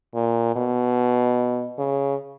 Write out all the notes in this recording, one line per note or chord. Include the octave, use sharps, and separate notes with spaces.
A#2
B2
C#3